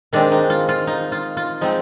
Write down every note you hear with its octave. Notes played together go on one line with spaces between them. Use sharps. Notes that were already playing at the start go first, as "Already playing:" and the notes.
D#3 G#3 C4 D4
D#4
F4
F4
D#4
F4
F4
F3 G#3 C4 D#4